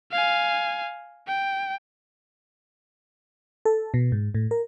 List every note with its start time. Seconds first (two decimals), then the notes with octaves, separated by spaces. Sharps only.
0.12 F5 G#5
1.28 G5
3.65 A4
3.94 B2
4.12 G#2
4.35 A2
4.51 A#4